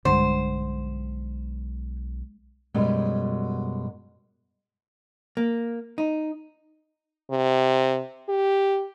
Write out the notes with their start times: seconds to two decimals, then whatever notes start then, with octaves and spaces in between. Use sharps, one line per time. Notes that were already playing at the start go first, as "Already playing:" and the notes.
0.05 B1 G2 D3 G#3 C5 F#5
2.74 F#2 B2 G3 G#3
5.37 A#3
5.98 D#4
7.31 C3
8.29 G4